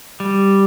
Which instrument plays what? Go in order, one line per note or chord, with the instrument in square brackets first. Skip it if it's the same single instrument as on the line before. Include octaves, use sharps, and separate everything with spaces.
[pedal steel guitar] G3